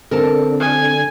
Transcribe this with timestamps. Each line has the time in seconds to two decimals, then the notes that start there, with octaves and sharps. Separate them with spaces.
0.11 D3 C4 A4 A#4 A5
0.60 G#5